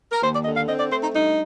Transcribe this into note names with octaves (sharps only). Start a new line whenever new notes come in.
A#4
D#2 C5
D5
D3 D#5
F5
C4 D#5
D5
A3 C5
D#4
G2 D#4